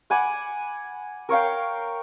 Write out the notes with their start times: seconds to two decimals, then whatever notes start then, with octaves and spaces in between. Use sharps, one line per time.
0.10 F#5 G#5 B5 D6
1.29 A#4 C#5 F5 G5